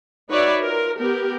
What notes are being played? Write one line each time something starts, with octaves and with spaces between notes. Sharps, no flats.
D#4 F#4 B4 C#5 D5 E5
F4 A#4
B3 G4 A#4